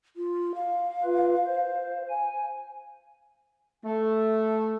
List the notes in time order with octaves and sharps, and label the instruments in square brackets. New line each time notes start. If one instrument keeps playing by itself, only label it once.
[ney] F4
F5
[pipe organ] F4 B4
C5
G#5
[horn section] A3